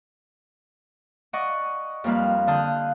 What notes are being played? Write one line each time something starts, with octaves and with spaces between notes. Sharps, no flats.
D5 D#5 F#5 C#6
F2 G3 A#3 B4 F5
D3 F5 A5 D#6 F#6 G6